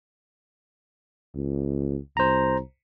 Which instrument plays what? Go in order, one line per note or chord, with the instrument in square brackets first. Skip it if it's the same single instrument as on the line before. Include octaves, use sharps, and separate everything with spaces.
[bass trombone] C#2
[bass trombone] C2 [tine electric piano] C5 A#5